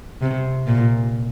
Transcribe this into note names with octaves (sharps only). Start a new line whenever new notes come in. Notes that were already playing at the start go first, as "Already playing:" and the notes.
C3
A#2